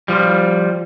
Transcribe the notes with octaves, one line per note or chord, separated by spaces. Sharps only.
F3 G3